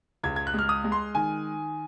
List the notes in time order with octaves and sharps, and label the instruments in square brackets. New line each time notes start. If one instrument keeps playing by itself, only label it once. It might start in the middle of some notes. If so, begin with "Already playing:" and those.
[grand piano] C#2 G#6
G#6
F#6
G#3 F6
D#6
G#3
C6
D#3 G#5